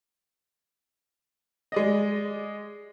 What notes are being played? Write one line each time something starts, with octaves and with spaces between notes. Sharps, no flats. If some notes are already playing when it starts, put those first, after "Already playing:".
G#3 D5 D#5